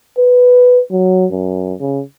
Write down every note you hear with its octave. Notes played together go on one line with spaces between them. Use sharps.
B4
F#3
F#2
C#3